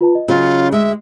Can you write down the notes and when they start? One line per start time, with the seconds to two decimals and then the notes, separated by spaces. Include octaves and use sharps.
0.01 F4 B4 A5
0.15 D#5
0.28 C#3 F#3 C#4 F4
0.72 D2 G#3 E5